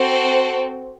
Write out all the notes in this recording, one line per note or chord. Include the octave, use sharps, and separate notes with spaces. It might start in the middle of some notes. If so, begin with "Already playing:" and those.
Already playing: C4 F#4 A4 C5